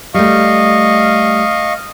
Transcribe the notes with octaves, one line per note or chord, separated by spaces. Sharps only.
G3 A3 D#5 F5 C#6